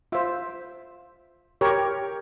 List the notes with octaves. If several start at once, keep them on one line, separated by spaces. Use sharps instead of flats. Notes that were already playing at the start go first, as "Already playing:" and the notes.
F4 C5 E5
G4 A#4 C#5